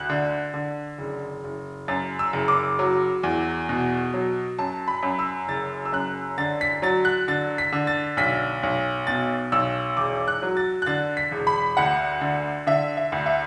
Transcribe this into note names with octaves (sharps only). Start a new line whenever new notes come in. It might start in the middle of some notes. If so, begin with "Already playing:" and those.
Already playing: D2 F#6
D3
D3
F#1
F#1
F#2 A6
E6
F#1
D6
F#3
E2
B2
F#3
F#2 A5
B5
F#2
E6
F#1 A6
E6
F#2 F#6
D3 A6
B6
F#3 A6
F#6
D3 A6
B6
D3
A6
B1 B6
B1
B2 A6
B1 E6
E1 D6
F#6
F#3
A6
F#6
D3 A6
B6
E1
B5
D2 F#5
D3
D3 E5
E5
D2
E5